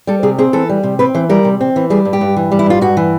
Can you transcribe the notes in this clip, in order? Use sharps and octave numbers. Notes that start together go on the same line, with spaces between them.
G3 A4
C3 G#4
C4 G#4
E3 A4
G3
C3
C4 B4
E3 C5
G3 A#4
C3
C4
E3
G3 G#4
G2
G4
G2
E3
G3
E4
G2 F4
G2 F#4
E3